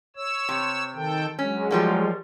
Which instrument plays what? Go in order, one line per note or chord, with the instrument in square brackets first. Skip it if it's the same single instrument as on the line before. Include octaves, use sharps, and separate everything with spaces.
[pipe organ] C#5 E6
[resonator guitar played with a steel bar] C3
[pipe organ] D#3 A4 G5
[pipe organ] F#3 G#3 [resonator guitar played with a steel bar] C#4
[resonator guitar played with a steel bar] F3 G3 A#3